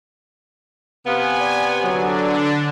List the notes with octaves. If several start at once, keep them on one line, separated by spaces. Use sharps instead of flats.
C3 B3 F5 G#5
D5
D3 F#3 D4